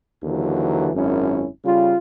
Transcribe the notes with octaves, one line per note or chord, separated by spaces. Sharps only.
D#2 D3 E3 F#3
G#1 F#2 C#4 E4
C#3 G3 F4